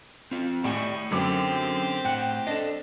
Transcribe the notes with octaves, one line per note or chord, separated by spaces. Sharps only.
C4 F4
A2 G4 D5 G#5 C#6
F#2 D3 C4 G4 D6
A2 F#5 G5
D4 A4 D#5